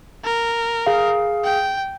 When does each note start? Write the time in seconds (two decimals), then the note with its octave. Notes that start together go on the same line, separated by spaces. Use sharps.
0.25 A#4
0.87 G#4 F5
1.44 G5